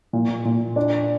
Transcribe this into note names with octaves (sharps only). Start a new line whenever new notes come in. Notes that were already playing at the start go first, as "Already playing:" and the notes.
A#2
A#2
D4